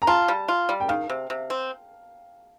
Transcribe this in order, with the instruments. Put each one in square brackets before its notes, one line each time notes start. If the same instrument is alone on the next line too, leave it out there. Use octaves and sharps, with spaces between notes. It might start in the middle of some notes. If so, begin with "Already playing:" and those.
[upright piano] A#5
[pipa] F4 [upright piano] A5
[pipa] G3
F4
G3
[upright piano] G5
[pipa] D#3 [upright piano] F5
[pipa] C3
C3
C4